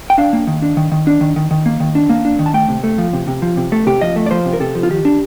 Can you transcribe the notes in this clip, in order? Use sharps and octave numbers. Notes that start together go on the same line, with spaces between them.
G5
D4 F5
A#3
D#3
D4
D#3
D#3
D4
D#3
D#3
D#3
A#3
D#3
D4
A#3
D4
D#3
A5
A3 G5
C3
A3
F3
C3
C3
F3
C3
A3 A4
C3 G4
F3 D#5
A3
D5
F3 C5
C3
A#4
C3 A4
F3
F4
D#3 G4
D4